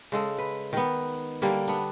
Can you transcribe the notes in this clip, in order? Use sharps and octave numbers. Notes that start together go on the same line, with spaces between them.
C#3 G#3 A4
B4
D#3 B3
D3 G3 A#3
B3 D4